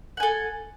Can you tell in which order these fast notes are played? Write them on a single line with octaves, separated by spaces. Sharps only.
F#5 G#5 A4